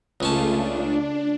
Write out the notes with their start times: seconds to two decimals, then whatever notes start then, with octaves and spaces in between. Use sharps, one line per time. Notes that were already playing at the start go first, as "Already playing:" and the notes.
0.20 C#2 C#3 A3 C#4 F4 A5
0.53 D4